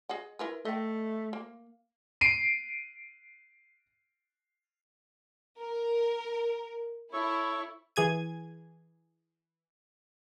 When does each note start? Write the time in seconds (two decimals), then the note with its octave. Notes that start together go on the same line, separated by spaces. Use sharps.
0.09 G#4 D#5 F#5
0.39 E4 A#4 B4
0.65 A3 D#5 G5
1.33 A#3
2.21 C7 D7 D#7
5.59 A#4
7.13 E4 A4 C#5 C#6
7.96 E3 G#4 G#6 D#7